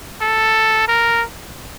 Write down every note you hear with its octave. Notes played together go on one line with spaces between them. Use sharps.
A4
A#4